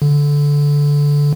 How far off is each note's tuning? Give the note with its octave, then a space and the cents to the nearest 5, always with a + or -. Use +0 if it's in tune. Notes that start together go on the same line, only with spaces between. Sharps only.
D3 -15